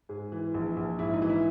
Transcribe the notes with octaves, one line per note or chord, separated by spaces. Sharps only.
G#2 G#4
E3
A#1
A#1
G#2 E4
D#4
E3
E4